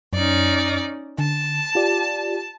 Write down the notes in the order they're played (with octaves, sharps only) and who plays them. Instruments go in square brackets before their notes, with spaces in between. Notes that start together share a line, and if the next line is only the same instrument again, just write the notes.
[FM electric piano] F#2 [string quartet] C#4 D#4 D5
[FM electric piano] D3 [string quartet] A5
[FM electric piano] F4 G4 D5